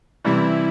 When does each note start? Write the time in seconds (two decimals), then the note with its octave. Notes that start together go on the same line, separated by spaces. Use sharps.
0.24 C3 E3 G3 E4